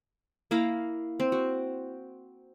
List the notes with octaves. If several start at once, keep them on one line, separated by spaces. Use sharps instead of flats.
A#3 E4 F5 A#5
C4
F#4